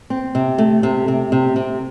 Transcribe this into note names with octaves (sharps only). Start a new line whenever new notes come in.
C4
C3
A3
C3
C3
C3
C3